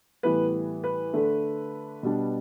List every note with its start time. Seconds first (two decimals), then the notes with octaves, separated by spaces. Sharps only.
0.23 A2 E3 G3 B3 B4
0.84 B4
1.13 D3 A3 D4
2.03 B2 G3 D4